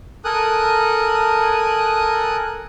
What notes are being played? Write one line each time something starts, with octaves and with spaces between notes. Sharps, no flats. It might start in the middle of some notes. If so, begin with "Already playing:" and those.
A4 A#4 G#5 D#6 F#6